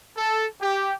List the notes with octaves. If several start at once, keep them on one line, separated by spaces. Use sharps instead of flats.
A4
G4